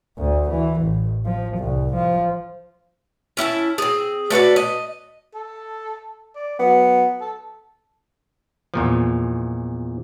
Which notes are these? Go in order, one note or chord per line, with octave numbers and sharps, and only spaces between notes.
D2
E3
A1
F3
C2
F3
C#4 E4 G5 A5
C4 G#4
A3 F#4 B4 D5
D#5
A4
D5
F#3 B3
A4
E2 A#2 F3